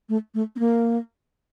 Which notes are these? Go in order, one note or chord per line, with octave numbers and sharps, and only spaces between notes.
A3
A3
C4
A#3